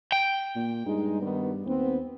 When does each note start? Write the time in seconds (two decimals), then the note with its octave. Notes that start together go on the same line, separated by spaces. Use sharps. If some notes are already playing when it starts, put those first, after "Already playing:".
0.12 G5
0.56 A#2
0.86 G2 G#3 D#4
1.21 D#3 G3 B3
1.66 D#2 B3 C4